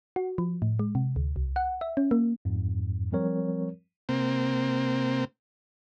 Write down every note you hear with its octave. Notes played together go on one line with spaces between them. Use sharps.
F#4
F3
A2
G#3
C3
D2
C2
F#5
E5
C#4
A#3
F2 G#2
F3 G3 C4 A#4 C#5
C3 A#3 C4